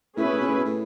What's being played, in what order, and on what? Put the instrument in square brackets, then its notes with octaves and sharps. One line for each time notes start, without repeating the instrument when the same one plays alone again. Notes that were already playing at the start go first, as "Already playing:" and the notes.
[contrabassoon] A2 [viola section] C#4 E4 G#4 B4
[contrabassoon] B2
A2
B2
A2
B2
A2